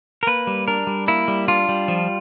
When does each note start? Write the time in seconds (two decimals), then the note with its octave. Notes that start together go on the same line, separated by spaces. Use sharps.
0.23 A#4
0.27 A#3 B4
0.47 G3
0.68 D4 A#4
0.87 G3
1.08 A#3 E4
1.28 G3
1.48 D4 F4
1.69 G3
1.88 F3